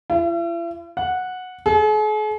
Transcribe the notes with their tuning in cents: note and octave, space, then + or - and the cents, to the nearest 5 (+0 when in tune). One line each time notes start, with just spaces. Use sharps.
E4 +45
F#5 -10
G#4 +45